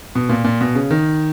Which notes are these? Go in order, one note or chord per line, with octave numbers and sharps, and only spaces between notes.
B2
A#2
A#2
B2
C#3
D#3